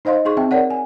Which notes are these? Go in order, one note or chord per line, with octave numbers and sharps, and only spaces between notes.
D#4 C5 D#5 F5 C6
D#4 G#4 C6 C#6
C4 E5 G5
A#4 C#5 D5 F#5
G#5